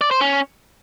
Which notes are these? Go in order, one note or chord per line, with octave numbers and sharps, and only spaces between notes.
D5
C5
C#4